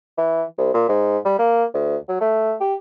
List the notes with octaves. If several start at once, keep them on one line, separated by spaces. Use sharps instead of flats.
E3
C2
A#2
G#2
G3
A#3
D2
F#3
A3
G4